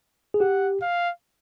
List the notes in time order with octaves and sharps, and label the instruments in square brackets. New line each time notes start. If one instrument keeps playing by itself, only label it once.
[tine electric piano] G#4
[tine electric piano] G4 [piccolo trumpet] F#5
[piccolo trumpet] F5